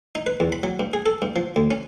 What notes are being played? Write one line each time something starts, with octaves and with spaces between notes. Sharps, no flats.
D#4
B4
E2
B5
F#3
G2
G#4
A4
G2
F3
D2
C#4